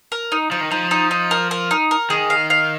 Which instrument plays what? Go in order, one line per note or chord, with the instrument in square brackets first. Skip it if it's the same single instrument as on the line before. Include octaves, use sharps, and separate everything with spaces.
[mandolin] A#4
D#4
[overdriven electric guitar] F3 [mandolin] D#4
[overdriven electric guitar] D#3
[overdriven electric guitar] F3 [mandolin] D#4
[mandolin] D#4
D#4
A#4
A#4
D#4
A#4
[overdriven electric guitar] D#3 [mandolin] G#4
[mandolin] F5
F5